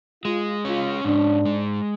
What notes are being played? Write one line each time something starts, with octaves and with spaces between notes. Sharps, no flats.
G#3 F4
C#4 F4
G#2 D4
G#3